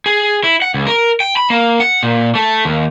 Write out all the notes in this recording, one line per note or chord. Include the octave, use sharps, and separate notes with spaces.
G#4
E4
F#5
C#2
A#4
G5
B5
A#3
F#5
A#2
A3
D#2